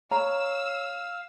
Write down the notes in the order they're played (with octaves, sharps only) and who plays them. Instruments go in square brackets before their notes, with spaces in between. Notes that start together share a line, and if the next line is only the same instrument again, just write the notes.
[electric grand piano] C#5 [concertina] F5 [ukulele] A#5 [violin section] E6